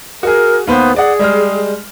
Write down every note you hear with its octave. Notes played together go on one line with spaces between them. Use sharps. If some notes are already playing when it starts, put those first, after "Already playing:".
F#4 G#4 A#4
D#2 B3 B4 C5
G#4 D5 F#5
G3 G#3 F6